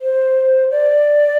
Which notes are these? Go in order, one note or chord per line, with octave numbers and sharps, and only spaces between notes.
C5
D5